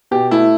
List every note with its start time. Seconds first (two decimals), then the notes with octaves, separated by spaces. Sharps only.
0.11 B2 G4
0.31 A3 E4